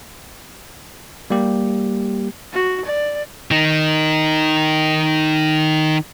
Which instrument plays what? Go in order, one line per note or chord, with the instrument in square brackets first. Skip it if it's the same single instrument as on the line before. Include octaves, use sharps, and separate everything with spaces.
[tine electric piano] G3 A#3 G4
[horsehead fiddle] F#4
D5
[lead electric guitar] D#3 D#4